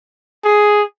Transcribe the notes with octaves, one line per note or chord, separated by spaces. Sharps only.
G#4